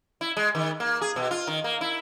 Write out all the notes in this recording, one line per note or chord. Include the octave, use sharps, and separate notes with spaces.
E4
G#3
D#3
A#3
G#4
B2
F4
D#3
A#3
E4